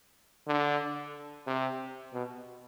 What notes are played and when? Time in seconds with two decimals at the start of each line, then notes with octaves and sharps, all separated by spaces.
0.48 D3
1.47 C3
2.13 B2